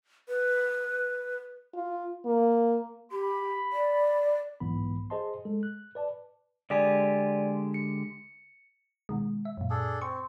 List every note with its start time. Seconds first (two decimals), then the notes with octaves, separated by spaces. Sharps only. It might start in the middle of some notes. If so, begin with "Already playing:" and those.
0.29 B4
1.74 F4
2.25 A#3
3.12 G4 B5
3.73 D5
4.60 B1 G#2 E3 B3 B5
5.10 G#4 C5 D#5 A5 C6
5.45 G#3 A4
5.63 F#6
5.95 B4 D5 A5
6.70 D3 G#3 G4 D5 G#5
7.74 C#7
9.09 B2 D#3 G#3
9.45 E5
9.57 F#2 A#2
9.70 D4 G#4 A4
10.02 C4 C#6